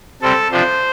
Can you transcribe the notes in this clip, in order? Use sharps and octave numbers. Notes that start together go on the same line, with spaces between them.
C3 G3 C4 A4
C3 F3 D4 C5